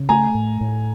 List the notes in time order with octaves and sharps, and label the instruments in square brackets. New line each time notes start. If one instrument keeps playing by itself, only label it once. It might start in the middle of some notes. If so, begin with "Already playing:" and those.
Already playing: [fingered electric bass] C#3
[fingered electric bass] A3 [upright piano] G#5 A#5
[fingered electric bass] A2
A2